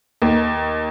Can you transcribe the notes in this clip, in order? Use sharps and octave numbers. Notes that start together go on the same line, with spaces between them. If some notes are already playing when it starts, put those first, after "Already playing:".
D#2